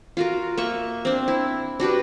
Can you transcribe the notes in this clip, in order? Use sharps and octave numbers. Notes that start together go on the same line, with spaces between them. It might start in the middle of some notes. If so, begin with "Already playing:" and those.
F4 F#4 A#4
A#3 E5 C#6
C4 D4
E4
D4 F#4 G4 B4